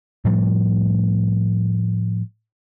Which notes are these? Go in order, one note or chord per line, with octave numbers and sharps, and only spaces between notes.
A2 F3 G3 A3